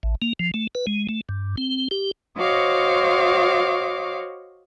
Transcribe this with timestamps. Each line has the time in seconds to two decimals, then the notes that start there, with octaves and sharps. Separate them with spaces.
0.03 A1
0.22 A#3
0.40 F3
0.54 A3
0.75 B4
0.87 G#3
1.09 A3
1.29 G2
1.58 C4
1.91 G4
2.37 F#4 C5 C#5 D#5 F5 D6